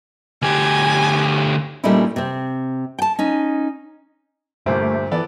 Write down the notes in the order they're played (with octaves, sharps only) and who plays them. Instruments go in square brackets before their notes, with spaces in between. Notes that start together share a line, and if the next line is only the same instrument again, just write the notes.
[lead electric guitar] D2 G4 [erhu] G#5
[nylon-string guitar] A#2 G3 A3 C#4 D#4 E4
C3 C4
G5 A5
C#4 D#4
[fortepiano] D2 A#2 [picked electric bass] G2 [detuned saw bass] A3 [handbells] G4 C5 E5
[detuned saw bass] E3 [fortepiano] B3 A4 D5